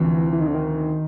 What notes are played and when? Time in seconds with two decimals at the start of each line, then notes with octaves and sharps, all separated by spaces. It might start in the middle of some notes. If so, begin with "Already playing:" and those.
Already playing: D2 C3 E3 F3 C4
0.33 E3
0.41 D#3
0.47 D3
0.55 D#3